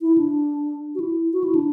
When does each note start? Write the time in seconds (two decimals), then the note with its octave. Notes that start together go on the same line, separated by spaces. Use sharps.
0.01 E4
0.18 D4
0.95 F#4
1.00 E4
1.33 F#4
1.44 E4
1.55 D4